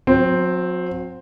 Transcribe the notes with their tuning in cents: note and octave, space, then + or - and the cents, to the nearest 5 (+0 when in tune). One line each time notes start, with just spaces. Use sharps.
F#3 -40 C4 +0